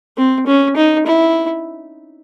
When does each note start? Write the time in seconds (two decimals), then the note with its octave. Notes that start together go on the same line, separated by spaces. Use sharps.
0.17 C4
0.47 C#4
0.76 D#4
1.06 E4